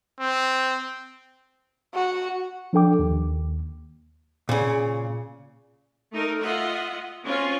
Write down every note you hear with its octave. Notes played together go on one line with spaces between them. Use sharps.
C4
F#4
F3 D4 A4 G5 D6
D#2
A#2 C#3
A3 D#4 A#4
F4 D#5 E5 F#5
C4 C#4 F4